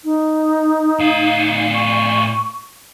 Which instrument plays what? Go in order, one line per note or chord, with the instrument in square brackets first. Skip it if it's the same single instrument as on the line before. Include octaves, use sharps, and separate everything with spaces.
[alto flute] D#4
[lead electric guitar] A2 F5
[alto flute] C#6